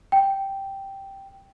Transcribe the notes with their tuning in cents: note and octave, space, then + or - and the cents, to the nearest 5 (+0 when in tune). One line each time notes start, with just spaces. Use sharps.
G5 -5